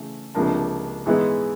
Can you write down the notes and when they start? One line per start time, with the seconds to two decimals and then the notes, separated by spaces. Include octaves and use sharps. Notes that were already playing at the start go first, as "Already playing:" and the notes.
Already playing: C#3 E3 A3
0.35 C#2 C3 F3 A#3 D4
1.06 G#2 E3 G#3 B3 E4